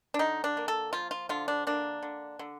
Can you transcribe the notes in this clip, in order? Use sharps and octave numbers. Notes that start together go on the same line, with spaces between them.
D4
D3 D#4
D4
A#3
A4
F3 F4
F4
D3 F4
D4
A#3 D4
D3
D3